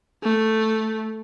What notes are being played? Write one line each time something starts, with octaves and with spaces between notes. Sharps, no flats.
A3